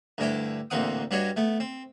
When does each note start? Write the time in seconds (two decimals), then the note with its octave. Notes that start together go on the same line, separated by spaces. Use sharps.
0.18 D2 G2 D4 E4 G4
0.70 A1 D2 A#2 C4 F#5 D#6
1.11 G2 G3 D4 F#4 C#5 D#5
1.36 A3 B3
1.60 C4